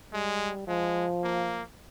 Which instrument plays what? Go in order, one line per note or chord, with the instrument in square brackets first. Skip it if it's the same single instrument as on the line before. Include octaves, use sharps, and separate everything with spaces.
[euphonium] G3 [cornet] G#3
[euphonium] F3 [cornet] G#3
[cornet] A#3